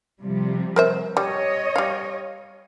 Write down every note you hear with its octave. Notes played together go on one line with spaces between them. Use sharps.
C3 F3 G3
A#4 C5 E5
G3 C#5 D#5
G3 F5